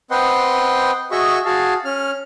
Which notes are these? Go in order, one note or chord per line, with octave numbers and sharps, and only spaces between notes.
C4 B4 D#5 F#5 G5 C6
F#4 G#4 D#5 E5 C#6
F#4 G#4 F5 A5
C#4 F6